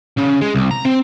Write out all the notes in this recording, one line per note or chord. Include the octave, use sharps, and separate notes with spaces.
C#3
G#3
C2
A#5
C4